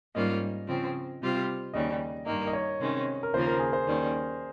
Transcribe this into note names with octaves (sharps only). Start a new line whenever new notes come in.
G#2 G3 A#3 C#4 F4 D#5
C#3 F3 C4
C3 G3 C4 F4
D#2 C#3 G3 D#5
G2 D#3 A#3 D#5
D#5
C#5
C3 D#3 G#3 C#4
A#4
D#2 C#3 F3 A#3 F4 C5
A#4
G#4
C5
D#2 D#3 G3 C#4